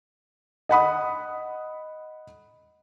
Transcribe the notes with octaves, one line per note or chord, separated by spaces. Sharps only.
D#5 F#5 B5 D#6